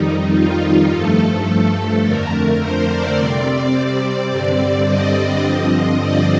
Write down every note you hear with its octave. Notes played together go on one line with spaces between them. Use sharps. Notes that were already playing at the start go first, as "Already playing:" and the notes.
Already playing: F2 D#3 G3 D#4
F4
G2 F3 A3 A4
F2 D3 A3 A#4
C5
D5
C3 G3 C4 D5
G2 D3 G3 C4
D#5
G2 D3 F3 C4
D5